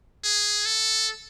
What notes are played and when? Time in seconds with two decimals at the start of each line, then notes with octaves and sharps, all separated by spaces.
0.24 G#4
0.66 A4